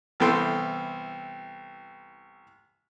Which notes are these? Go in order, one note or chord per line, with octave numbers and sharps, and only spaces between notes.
C2 E3 B3 A4 G5 C6